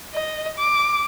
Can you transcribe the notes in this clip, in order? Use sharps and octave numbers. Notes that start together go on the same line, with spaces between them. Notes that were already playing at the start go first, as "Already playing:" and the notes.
D#5
D6